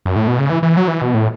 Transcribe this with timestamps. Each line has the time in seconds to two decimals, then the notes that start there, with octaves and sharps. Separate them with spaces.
0.06 F#2
0.16 A2
0.28 B2
0.39 C#3
0.50 E3
0.63 E3
0.77 F#3
0.88 E3
1.02 B2
1.14 A2